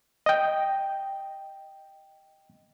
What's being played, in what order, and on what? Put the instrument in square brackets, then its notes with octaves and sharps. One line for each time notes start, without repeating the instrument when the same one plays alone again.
[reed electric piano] D#5 G5